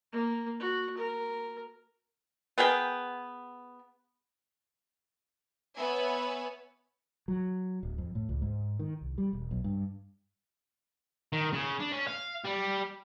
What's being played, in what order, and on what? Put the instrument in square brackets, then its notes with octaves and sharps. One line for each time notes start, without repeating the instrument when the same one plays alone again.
[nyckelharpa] A#3
F#4
A#4
[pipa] B3 G#4 A#4 G5
[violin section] B3 B4 C#5 E5 G#5
[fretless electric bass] F#3
D1
F2
A2
C#2
G#2
D#3
C2
G3
E1
B1
G2
[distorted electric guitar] D#3
C#3
D4
C#4
F5
G3